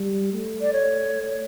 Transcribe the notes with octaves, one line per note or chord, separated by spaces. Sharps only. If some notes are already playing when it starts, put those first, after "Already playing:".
Already playing: G3
A3
D5
C#5